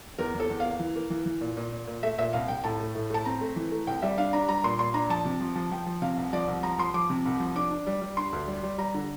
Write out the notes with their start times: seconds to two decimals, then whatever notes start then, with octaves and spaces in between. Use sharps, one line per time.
0.19 E2 A#4
0.34 E2
0.40 A4
0.50 E2
0.60 F5
0.65 A#3
0.80 E3
0.96 A#3
1.10 E3
1.26 E3
1.41 A#2
1.57 A#2
1.72 A#2
1.87 A#2
2.03 A3 E5
2.19 A#2 E5
2.33 C2 F5
2.48 C2 G5
2.64 A2 A5
2.80 A3
2.95 A2
3.10 A3 A5
3.25 C4 A#5
3.41 A3
3.56 E3
3.72 A3
3.87 C2 G5
4.02 G3 E5
4.18 D4 F5
4.33 D4 A#5
4.48 G3 A#5
4.64 A#2 C6
4.79 A#2 C6
4.94 D4 A#5
5.09 F3 A5
5.25 C3
5.41 F3
5.56 F3
5.71 F3 G5
5.86 F3
6.02 C3 F5
6.17 C2
6.33 F3 D5
6.48 C2
6.63 F3 A#5
6.78 F3 C6
6.94 F3 D6
7.10 C3
7.25 C2
7.40 F3
7.55 D4 D6
7.71 D4
7.87 G3
8.02 G3
8.17 D4 C6
8.33 D2
8.47 G3
8.63 G3
8.78 G3 A#5
8.94 D3